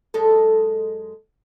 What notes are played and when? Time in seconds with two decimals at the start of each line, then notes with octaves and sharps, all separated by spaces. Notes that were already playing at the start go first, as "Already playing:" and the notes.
0.14 F#2 G#3 A4